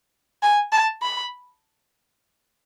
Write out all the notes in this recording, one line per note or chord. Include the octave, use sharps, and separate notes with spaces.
G#5
A5
B5